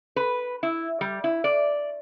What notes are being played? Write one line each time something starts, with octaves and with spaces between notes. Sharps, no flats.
B4
E4
G3
E4
D5